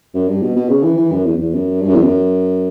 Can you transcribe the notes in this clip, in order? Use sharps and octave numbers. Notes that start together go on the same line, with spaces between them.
F#2
G2
B2
B2
C#3
E3
E3
F#2
E2
E2
F#2
G2
F#2
E2
F#2